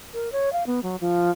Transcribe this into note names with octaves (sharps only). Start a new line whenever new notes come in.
A#4
C#5
F5
B3
F#3
F3